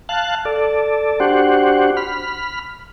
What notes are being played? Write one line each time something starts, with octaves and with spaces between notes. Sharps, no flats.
F5 A5 F#6
A4 D5
D4 F#4 G4 C5 F#5
B5 F6